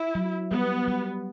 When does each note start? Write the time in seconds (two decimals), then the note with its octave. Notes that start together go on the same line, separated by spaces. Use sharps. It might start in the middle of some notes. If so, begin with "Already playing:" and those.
Already playing: E4
0.15 F#3
0.51 G3 B3
0.88 G3